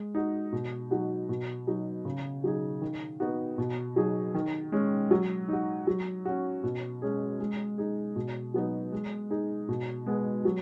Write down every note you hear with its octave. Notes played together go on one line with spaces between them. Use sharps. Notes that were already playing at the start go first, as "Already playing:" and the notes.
Already playing: G#3
D#4 F#4
B2
F#3 D#4 F#4
B2
F#3 D#4
C#3
F#3 D#4 G#4
D#3
B3 D#4 F#4
B2
F#3 D#4 G#4
D#3
G#3 C#4
F#3
D#4 F#4
F#3
C#4 F#4
B2
G#3 C#4 G#4
G#3
D#4 G#4
B2
F#3 B3 D#4
G#3
D#4 G#4
B2
G#3 B3 G#4
F#3